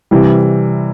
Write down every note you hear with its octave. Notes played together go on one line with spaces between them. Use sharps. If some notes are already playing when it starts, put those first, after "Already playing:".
C3 E3 G3